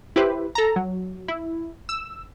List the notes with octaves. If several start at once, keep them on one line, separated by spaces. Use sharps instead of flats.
E4 G4 B4 C5
A4 A#5
F#3
E4
E6